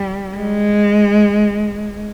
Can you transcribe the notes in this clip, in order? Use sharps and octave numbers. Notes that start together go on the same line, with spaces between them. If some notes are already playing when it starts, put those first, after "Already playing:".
Already playing: G3
G#3